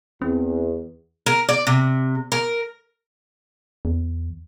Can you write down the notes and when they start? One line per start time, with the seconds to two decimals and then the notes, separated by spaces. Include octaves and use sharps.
0.22 E2 C4
1.26 A#4
1.49 D5
1.67 C3
2.32 A#4
3.85 E2